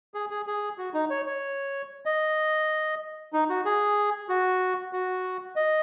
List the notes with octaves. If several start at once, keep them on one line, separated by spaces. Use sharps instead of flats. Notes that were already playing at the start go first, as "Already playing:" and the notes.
G#4
G#4
G#4
F#4
D#4
C#5
C#5
D#5
D#4
F#4
G#4
F#4
F#4
D#5